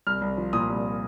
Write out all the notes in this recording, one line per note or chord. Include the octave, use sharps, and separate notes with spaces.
C2 F6
C2
F3
A#2 D#6
C2